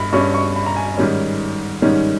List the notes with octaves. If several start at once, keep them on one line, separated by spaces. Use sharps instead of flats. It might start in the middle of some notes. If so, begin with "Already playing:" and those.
Already playing: G2 B5
G2 G3 C#4 C#6
C#6
B5
A#5
G#5
G#2 D#3 G3 C#4
G#2 D#3 G3 C#4